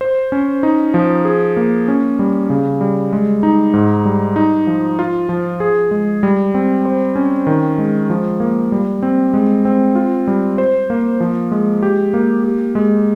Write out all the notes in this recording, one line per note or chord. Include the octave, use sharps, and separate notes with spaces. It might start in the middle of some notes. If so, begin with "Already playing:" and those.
C5
C#4
D#4
F3
G#4
A#3
C#4
G3
C#3
G3
G#3
D#4
G#2
G3
D#4
F3
F4
F3
G#4
G#3
G3
C4
C5
C#4
D#3
G#3
F3
A#3
G3
C4
G#3
C4
F4
G3
C5
A#3
F3
G#3
G4
A#3
G4
G#3